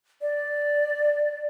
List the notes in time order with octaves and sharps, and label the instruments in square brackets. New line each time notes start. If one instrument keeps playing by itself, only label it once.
[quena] D5